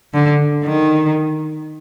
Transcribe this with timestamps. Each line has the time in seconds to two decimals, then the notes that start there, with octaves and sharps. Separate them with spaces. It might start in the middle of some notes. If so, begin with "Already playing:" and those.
0.14 D3
0.64 D#3